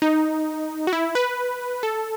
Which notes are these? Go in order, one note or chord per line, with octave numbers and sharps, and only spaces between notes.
D#4
F#4
E4
B4
A4